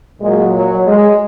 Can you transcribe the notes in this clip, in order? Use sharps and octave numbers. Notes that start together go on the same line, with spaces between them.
A#2 F#3 G#3
F#3
G#3